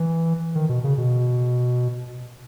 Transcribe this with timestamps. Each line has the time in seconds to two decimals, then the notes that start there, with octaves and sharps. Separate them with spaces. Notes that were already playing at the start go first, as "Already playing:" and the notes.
Already playing: E3
0.55 D#3
0.69 B2
0.84 C#3
0.98 B2